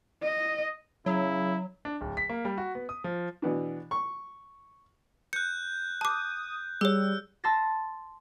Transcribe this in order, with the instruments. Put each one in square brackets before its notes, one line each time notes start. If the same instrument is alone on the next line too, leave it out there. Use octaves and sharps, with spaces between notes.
[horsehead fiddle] D#5
[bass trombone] C#3 [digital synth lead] F#3 [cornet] E4
[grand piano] D4
D1
B6
A#3
G3
F#4
B3
D#6
F3
[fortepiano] B2 E3 B3 D4
C#6
[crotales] F#6 G6 [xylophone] C#7
[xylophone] A5 D6 [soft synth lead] D#6
[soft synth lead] G3 [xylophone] G#4 C#5 [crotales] E6
[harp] A5 C6 E6 A6 A#6